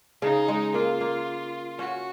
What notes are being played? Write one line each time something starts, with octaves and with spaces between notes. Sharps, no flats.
C#3 D#4
G#3
A#3 F4
A#3
C#4 F#4